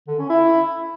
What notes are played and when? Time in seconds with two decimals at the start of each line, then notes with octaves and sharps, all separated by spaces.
0.08 D3
0.19 C#4
0.30 E4